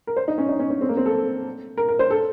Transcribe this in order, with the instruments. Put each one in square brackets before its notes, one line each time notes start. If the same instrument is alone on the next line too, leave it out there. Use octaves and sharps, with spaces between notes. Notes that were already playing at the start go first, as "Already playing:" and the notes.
[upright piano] A#4
C5
D#4
C#4
D#4
C#4
C#4
C4
A#3
C4
A4
A#4
A#4
C5
A4